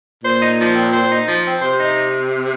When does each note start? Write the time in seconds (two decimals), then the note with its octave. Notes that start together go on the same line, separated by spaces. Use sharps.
0.23 A#2 C5
0.42 D#4
0.59 F3
0.75 C4
0.93 C5
1.11 D#4
1.27 F3
1.45 C4
1.62 C3 C5
1.80 D#4